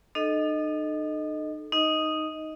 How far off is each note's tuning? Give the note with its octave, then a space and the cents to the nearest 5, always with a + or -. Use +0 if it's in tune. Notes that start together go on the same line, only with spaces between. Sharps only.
D#4 -45 A4 -15 D#5 +0
D#4 +0 D#5 +10